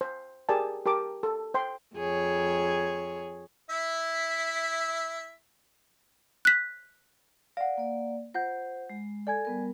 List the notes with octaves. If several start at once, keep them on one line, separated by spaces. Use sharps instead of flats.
C5
G4 G#4 A#4 D5 G#5 A5
G4 A#4 A5 D6
A4
C5 G5 C6
F2 G#4 C#5
E4 E5
F#6 B6
D5 F5 F#5
A#3 D5
F4 C5 F#5 G6
G#3
A4 D5 G#5 G#6
G3 B3 A#4